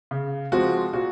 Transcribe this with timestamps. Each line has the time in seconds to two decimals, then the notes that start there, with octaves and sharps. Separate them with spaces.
0.11 C#3
0.52 F3 G#3 C4 F#4
0.93 A#2 F#4